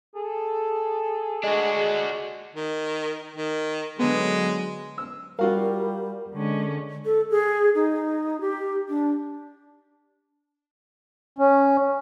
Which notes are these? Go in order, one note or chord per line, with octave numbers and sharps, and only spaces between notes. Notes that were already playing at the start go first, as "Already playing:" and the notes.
G#4 A4
G#3 D4 F#4
D#3
D#3
D3 F#3 G#3 B3
E6
G3 F4 F#4 A#4 F5
D3 G#3 C#4
A4
G#4
D#4
G4
D4
C#4